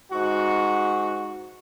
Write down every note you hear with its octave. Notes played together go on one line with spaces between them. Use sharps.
G#2 F#4